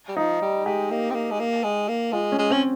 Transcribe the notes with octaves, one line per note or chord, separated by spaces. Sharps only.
G3
F3 D#4
G3
G#3 G4
A#3
C4
A#3
G#3
A#3
G#3
A#3
G#3 F4
C#4
G#3
C4 C#4